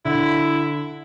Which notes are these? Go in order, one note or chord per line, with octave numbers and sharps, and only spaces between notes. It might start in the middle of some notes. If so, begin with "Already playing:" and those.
D3 E4